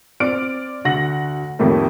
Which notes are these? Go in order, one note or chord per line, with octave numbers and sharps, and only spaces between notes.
C4 D5 F6 D7
D2 F#4 F#5 A#6 F#7
F2 A2 D#3 G3 A3 A#3